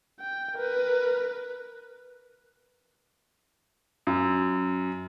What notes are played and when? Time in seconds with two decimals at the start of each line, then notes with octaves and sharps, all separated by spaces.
0.20 G5
0.55 A#4 B4
4.07 F#2